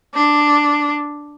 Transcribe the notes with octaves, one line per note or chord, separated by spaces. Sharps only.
D4